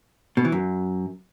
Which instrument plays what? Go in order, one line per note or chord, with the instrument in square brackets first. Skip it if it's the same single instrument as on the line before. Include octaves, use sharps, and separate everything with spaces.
[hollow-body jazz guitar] B2
E3
F#2